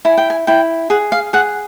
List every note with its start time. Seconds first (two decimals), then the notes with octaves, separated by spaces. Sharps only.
0.05 E4 G#5
0.18 G5
0.30 G#5
0.47 E4 G5
0.90 G#4 F#5
1.12 F5
1.33 G#4 F#5